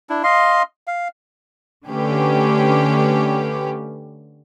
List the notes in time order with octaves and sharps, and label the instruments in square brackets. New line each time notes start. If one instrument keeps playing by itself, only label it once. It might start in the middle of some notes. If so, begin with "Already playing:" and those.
[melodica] D4 E4
D#5 F5 C6
F5
[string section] D3 A3 C#4 G4 B4